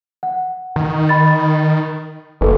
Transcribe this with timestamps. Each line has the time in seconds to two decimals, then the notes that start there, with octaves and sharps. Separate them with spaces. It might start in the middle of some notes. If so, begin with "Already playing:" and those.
0.23 F#5
0.76 D#3
1.09 D#5 B5 A6
2.41 F#1 A4 B4